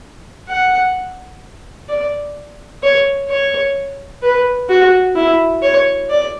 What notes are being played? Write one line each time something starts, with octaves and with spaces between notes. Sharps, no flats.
F#5
D5
C#5
C#5
B4
F#4
E4
C#5
D5